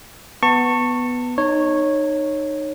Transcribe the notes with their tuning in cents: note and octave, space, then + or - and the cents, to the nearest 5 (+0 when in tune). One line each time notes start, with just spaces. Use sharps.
B3 +0 A5 +30 C#6 -10
D#4 -20 C#5 -10